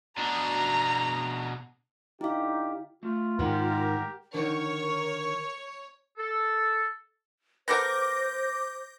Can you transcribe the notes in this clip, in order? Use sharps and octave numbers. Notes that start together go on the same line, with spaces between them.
B2 D4 A#5
D3 D#4 E4 G4 F5
A3 F4
G#2 D#3 G#3 G4 A#4 F#5
D3 D#3 A#4 C#5
A4
B3 A4 A#4 C5 D6 G6 A#6